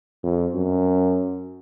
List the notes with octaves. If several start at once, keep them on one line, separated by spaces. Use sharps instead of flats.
F2
F#2